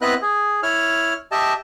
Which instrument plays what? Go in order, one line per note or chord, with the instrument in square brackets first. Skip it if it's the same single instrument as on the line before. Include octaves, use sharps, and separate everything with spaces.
[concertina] B3 C4 E4 B4 D#5 F#6
G#4
E4 C#5 F6
G4 D#5 E5 A5